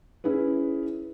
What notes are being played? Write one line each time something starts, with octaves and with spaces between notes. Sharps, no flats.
C#4 E4 G#4 B4